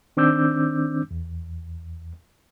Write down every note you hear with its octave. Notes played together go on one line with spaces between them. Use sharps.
D#3 C4 D4 D6 E6 G6
E2